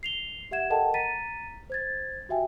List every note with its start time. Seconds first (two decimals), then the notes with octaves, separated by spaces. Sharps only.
0.03 C7 F7 G7
0.51 G4 E5 F#5 G#6 E7
0.70 A4 A#4 D#5 F#5 G5 A5
0.94 A#5 A6 B6 D#7
1.70 C5 G#6 A6
2.29 F#4 G4 E5 G5 G#5